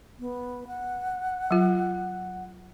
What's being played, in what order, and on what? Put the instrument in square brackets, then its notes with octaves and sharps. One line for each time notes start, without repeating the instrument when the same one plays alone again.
[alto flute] B3
F#5
[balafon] F#3 F4